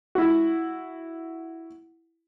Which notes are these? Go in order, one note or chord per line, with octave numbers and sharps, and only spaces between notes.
E4 F#4